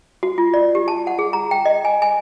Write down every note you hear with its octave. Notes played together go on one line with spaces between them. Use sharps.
F#4
F4
D5
G4
A5
F#5
G#4
A#5
G5
D#5
G#5
G#5